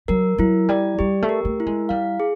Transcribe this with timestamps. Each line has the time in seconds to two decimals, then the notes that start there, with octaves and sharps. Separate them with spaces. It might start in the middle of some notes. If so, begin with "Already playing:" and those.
0.08 F#3 A#4
0.38 F#3 E4
0.69 G3 D5
0.99 G3 G4
1.22 A3
1.29 A#4
1.45 A3
1.60 E4
1.67 G#3
1.89 G3 F5
2.20 G#4